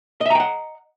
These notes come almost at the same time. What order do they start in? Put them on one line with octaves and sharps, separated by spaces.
D#5 E5 A#5 G5 F#5